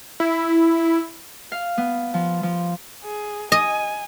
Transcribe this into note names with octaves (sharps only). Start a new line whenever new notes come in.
E4
F5
B3
F3
F3
G#4
D#5 G#5